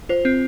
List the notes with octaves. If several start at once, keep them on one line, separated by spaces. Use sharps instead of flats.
F4 C5
C4